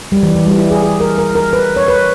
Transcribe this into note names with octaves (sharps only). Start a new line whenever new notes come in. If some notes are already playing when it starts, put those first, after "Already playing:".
G3
E3
E3
G3
E4
G#4
G#4
A#4
A#4
A#4
B4
C#5
B4